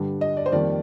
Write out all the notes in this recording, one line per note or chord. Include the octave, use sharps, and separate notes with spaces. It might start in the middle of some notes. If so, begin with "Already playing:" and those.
Already playing: G2 D3 G3
D#5
D5
C5
F2 D#3 G3 A#3 D5